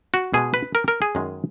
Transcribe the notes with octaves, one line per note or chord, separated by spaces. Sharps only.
F#4
B2 G#3 G#4
B4
A#4
A#4
G#4
F#2 D#3 G#3